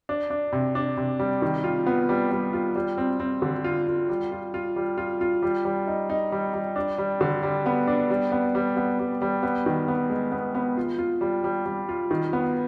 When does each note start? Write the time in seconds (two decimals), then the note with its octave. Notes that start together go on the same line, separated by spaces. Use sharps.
0.09 D4
0.30 D4
0.52 C3
0.75 D4
0.97 C3
1.19 G3
1.42 D#3
1.64 F4
1.86 B3
2.09 G3
2.31 G3
2.53 F4
2.75 G3
2.98 C4
3.20 C4
3.42 D3
3.64 F4
3.87 F4
4.09 G3
4.32 F4
4.54 F4
4.76 G3
4.98 F4
5.21 F4
5.42 G3
5.65 G3
5.87 D#4
6.10 D#4
6.32 G3
6.54 G3
6.76 D4
6.98 G3
7.21 D3
7.43 G3
7.66 B3
7.87 D4
8.10 G3
8.32 B3
8.55 G3
8.77 B3
8.99 G3
9.22 G3
9.43 B3
9.66 D#3
9.88 B3
10.10 G#3
10.32 B3
10.55 B3
10.77 F4
10.98 F4
11.21 G3
11.44 G3
11.66 G3
11.89 F4
12.11 D#3
12.33 B3